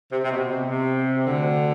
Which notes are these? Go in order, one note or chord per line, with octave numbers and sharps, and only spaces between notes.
C3
C3
B2
C3
C3
D2 D3